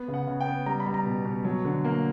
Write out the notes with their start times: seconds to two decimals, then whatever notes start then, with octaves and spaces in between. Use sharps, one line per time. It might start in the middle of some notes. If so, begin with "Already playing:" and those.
Already playing: B3
0.08 C#3
0.14 F#5
0.27 C#3
0.40 G5
0.46 B3
0.66 G3 A#5
0.80 B5
0.86 G3
0.94 A#5
1.06 B2
1.25 B2
1.45 F#3
1.65 D3
1.85 A#3